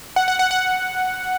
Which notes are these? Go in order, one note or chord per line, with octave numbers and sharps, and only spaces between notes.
F#5
F#5
F#5
F#5